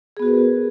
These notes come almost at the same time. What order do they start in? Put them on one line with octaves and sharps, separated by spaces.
G#4 B3 F#4 B4 A#4